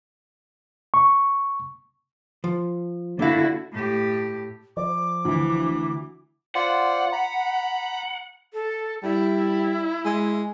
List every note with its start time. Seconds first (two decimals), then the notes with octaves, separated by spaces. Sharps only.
0.94 C#6
2.44 F3
3.19 D3 A#3 E4 F#4 F5
3.73 A2 G4
4.77 F3 D5 D6
5.25 D2 E3
6.55 F4 C5 D5 F#5
7.12 A#5 B5
8.53 A4
9.03 G3 E4
10.05 G#3